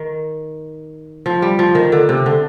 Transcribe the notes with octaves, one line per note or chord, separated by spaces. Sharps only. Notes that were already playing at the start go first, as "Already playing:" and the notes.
Already playing: D#3
F3
G3
F3
D#3
D3
C3
D3